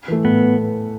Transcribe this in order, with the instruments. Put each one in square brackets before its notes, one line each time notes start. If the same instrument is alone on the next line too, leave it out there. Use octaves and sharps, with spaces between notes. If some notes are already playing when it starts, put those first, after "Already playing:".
[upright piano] E3 A3
[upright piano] A2 [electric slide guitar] B3